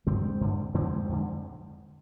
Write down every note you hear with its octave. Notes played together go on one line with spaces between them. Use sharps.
G2 D3 G#3 C4
G2 D3
F2 D3 G#3 C4
F2 D3